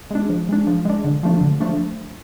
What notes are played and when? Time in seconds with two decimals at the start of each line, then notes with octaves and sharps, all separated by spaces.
0.11 G#3 D4
0.29 F3
0.49 G#3 D4
0.67 F3
0.85 G#3 D4
1.04 D3
1.23 F3 A3 D4
1.41 D3
1.60 F3 A3 D4